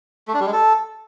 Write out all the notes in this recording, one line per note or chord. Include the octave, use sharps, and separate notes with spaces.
A3
D4
G3
G#3
A4